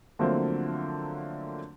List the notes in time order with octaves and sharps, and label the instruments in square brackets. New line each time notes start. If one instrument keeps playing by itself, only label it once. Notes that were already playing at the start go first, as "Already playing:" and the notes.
[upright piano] D3 F3 F#3 A3 A#3 C4